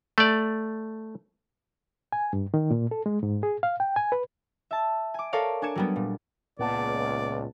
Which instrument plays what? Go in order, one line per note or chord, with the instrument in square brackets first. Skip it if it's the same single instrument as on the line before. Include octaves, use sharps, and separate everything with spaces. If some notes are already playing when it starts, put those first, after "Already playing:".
[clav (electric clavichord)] A3 D5
[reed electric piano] G#5
G2
D#3
A#2
A4
G#3
G#2
G#4
F5
G5
G#5
B4
[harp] E5 A5
G#5 D6
A4 A#4 C#5 D5 F5
D4 G#5 D6 G#6 C#7 E7
F#3 G3 B3
A#2
[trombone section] C#2 [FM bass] A#2 [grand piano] B3 F#5 A5 [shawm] D5